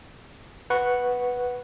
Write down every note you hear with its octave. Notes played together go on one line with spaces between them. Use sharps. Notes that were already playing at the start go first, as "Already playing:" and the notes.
B4 F#5 C#6